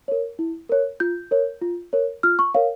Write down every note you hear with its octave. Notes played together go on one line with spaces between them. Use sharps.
A#4 C#5
E4
A#4 C#5
F4 G6
A#4 C#5
F4
A#4 C#5
F4 F6
C#6
A#4 C#5 F5